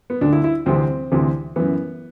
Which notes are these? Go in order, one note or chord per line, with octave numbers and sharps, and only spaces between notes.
B3
D2 D3 D4
E4
E4
D2 C3 E3 C4
D2 C3 E3
F#2 E3 B3